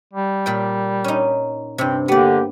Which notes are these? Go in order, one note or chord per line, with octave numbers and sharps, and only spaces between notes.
G3
A#2 D5 G5
C#4 D#4
G2 C3 C4
D3 A#3 B3 G4 D5